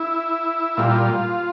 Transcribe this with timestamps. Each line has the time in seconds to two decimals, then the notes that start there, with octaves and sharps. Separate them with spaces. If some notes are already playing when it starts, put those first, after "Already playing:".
Already playing: E4
0.77 A#2 G3 F4